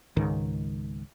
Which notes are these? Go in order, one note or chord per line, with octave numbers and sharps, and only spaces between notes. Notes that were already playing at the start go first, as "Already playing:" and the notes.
C#2 G#2 D#3